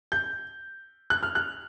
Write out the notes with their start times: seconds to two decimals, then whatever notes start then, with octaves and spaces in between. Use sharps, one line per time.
0.12 G6
1.10 F#6
1.23 F6
1.35 F#6